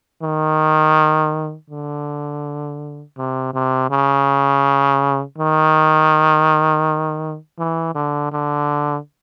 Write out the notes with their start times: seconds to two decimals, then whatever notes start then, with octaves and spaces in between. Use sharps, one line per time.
0.23 D#3
1.70 D3
3.17 C3
3.54 C3
3.91 C#3
5.38 D#3
7.59 E3
7.95 D3
8.32 D3